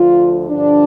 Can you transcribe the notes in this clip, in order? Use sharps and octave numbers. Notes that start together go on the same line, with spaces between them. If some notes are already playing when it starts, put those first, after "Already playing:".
Already playing: D2 D3 F3 F4
G2 D3 F3 D4